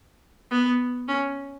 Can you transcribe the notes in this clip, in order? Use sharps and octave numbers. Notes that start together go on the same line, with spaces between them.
B3
C#4